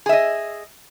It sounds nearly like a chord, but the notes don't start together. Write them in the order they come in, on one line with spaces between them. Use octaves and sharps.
G#4 E5 D#5